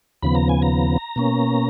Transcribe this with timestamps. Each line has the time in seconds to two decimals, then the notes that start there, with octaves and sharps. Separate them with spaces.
0.23 D#2 C#3 F3 B3 B5
0.35 A#5
0.49 G#5
0.62 A#5
1.16 B2 A#3 C#4